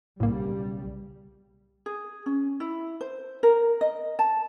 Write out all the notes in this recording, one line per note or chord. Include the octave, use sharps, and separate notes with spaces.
B1 A2 C#3 G3 A#3
G#4
C#4
E4
C5
A#4
D#5
A5